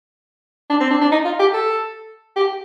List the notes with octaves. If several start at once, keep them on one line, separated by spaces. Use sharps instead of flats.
D4
C4
D4
D4
D#4
F4
G4
A4
G4